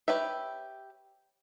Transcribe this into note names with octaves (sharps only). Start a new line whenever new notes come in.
G4 B4 C#5 E5